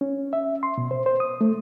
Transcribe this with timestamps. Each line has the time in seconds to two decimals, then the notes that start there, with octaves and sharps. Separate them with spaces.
0.01 C#4
0.33 E5
0.63 C6
0.78 B2
0.91 C5
1.06 C5
1.20 D#6
1.41 A3